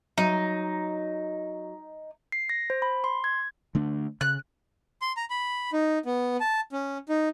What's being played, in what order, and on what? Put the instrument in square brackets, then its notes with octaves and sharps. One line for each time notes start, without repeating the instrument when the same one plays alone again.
[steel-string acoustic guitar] F#3 [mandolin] D#4
[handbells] C7
A#6
C5
B5
C6
G#6
[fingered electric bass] D3 A3 D4
[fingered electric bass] C#3 [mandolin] F#6
[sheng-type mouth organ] C6
A#5
B5
D#4
B3
A5
C#4
D#4